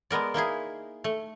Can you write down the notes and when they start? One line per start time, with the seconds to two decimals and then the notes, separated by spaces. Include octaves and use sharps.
0.11 G#3 B3 A#4 D5
0.34 A#3 D#4 E4 G#4
1.04 A3